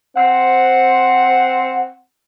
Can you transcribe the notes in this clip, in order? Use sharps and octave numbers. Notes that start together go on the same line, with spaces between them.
C4 F#5